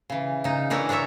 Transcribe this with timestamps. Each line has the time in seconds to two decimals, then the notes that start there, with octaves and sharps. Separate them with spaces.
0.10 C#3 E3
0.44 C#3 D#4
0.70 E3 D4 E4 A#4 C#5
0.89 D4 A4 A#4 C#5 E5